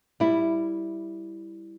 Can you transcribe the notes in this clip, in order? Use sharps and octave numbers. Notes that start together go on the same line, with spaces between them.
G3 E4